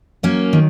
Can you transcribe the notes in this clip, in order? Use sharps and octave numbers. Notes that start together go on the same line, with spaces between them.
F#3 A#3 C#4
D#3